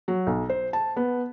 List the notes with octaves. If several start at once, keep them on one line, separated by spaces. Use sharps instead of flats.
F#3
B1
C5
A5
B3